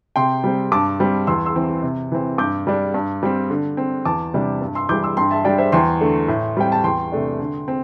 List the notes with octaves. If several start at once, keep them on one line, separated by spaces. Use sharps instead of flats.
C3 G5 C6
G3 C4
G2 A5 D6
G3 C4
E2 C6 E6
C6 E6
E3 C4
C3
E3 C4
G2 D6 G6
G3 D4
G2
G3 C4
D3
C4
E2 A5 D6
C3 G3 D4
G2
C6 E6
E3 G3 D6 G6
C6 E6
G2 G5 C6
E5 A5
G3 D4 D5 G5
C5 E5
E2 G5 C6
D3 A3
A2
G3 C4 G5
A5
E2 G5 C6
C3 A3 D4
D3
C4